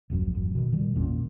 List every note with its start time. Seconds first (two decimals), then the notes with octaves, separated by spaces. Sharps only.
0.10 D#1 A1 F#2 F3
0.34 E1 F#2
0.55 B2 D#3
0.72 A#2 D#3 G3
0.95 G#1 E2 A#2 C#4